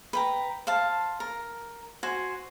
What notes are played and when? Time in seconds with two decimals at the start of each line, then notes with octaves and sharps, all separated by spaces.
0.13 B4 G5 A#5
0.67 C5 F5 A5
1.20 A#4
2.03 F#4 C5 G#5